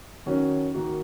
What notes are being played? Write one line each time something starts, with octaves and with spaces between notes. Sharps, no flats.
D#3 F#3 C#4 F#4
D#3 A#3 F#4